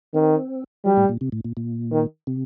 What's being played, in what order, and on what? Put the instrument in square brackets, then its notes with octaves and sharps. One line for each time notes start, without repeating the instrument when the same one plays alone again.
[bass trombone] D#3 [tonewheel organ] C4
[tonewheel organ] F#3 [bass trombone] G3
[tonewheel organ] A2
A#2
C3
A2
A#2
A#2
[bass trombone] D#3
[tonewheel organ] C3